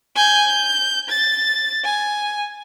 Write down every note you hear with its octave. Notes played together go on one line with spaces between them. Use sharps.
G#5 G6
G6
A6
G#5